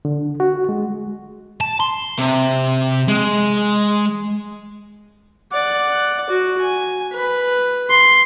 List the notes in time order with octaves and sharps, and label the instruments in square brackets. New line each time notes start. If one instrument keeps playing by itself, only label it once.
[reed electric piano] D3
F#4
G#3
[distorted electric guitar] A5
C6
C3
G#3
[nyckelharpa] D5 F#5
F#4
G#5
B4
C6